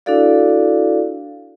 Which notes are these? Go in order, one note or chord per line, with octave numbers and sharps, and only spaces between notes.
D4 E4 F#4 A4 D5 F5